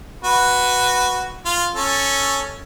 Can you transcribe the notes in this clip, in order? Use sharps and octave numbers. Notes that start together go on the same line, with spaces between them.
F#4 B4
F4
C#4 A4